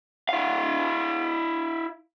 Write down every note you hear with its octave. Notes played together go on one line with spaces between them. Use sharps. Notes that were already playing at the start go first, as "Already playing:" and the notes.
E4 F5